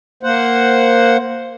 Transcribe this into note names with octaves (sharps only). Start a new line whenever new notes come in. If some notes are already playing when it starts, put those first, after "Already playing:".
A#3 C5 F#5